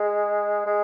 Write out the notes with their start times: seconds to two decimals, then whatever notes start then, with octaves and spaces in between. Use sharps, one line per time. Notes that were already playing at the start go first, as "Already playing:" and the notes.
Already playing: G#3
0.66 G#3